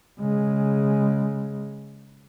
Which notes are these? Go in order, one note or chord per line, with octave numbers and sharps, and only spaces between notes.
C#3 G#3